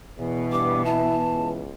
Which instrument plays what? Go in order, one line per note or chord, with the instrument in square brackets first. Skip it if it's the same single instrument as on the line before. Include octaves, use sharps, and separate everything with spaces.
[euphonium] E2 [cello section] B2 B3 [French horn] E3
[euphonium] G2 [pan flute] D6
[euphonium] E4 [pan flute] A5
[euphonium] C#2